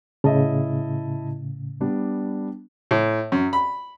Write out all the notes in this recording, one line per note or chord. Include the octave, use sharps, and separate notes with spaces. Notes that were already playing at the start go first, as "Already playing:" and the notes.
A2 C#3 E4 D#5 A5
G3 B3 D4
A2
F#2
B5